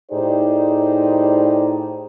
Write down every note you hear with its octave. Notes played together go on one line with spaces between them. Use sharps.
A2 D#4 G4 G#4 C5 D5